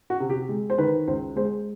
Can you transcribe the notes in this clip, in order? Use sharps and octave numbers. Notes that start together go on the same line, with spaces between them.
F#4
C3
G4
G#3
C5
D#3 B4
C#2 C5
G#3 C5